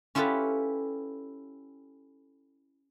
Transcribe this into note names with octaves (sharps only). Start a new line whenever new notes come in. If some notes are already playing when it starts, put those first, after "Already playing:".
C#4 E4 F4 G4 A4 B4